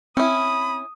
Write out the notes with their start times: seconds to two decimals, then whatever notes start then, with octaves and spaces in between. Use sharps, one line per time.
0.17 C4 C#4 E4 B5 D#6